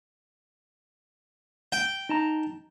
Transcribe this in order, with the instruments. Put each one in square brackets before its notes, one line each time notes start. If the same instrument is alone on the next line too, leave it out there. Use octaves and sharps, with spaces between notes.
[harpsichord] G5
[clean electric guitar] D#4 A5 A#5